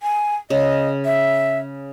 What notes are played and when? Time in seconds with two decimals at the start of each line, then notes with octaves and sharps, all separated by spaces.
0.03 G#5
0.50 C#3 D#5
1.05 E5